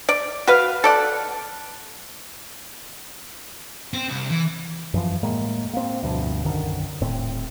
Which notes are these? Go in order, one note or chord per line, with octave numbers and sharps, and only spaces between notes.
D5
F#4 B4 F5
A4 D5 F#5
C4
C2
E3
F#2 E3 F3
A2 G#3 A#3
A#3 C4
D2 G2 B2 F3
B1 F#2 D3 D#3
D#1 A2 C4